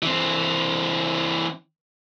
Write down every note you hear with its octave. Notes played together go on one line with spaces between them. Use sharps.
E3 C4